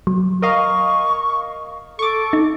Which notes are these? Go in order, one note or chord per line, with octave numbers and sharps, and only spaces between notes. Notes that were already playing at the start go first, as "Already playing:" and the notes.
F#3
A#4 D#5 F5 C#6
A4 C#6 D6
D#4